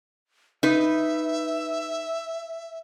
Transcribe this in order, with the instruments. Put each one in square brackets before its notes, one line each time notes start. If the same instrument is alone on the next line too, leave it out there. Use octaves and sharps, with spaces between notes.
[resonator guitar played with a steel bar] D#4 B4 [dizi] E5